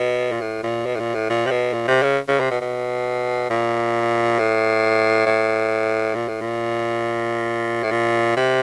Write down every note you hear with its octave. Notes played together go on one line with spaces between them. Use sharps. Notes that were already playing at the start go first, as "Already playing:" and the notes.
Already playing: B2
A#2
A2
A#2
B2
A2
A#2
A2
A#2
C3
B2
A#2
C3
C#3
C#3
C3
B2
B2
A#2
A2
A2
A#2
A2
A#2
A2
A#2
C3